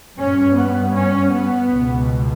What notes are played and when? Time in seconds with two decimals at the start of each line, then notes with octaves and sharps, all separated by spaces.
0.17 G2 C#4
0.56 B3
0.94 C#4
1.32 B3
1.70 C#2 B2